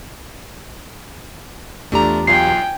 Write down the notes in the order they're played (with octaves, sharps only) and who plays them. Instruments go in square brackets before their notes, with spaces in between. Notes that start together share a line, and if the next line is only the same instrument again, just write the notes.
[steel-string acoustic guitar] E2 G4 A#5 [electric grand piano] A3 [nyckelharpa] D4 F4
[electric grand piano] B1 F4 [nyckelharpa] G5 G#5 [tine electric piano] C7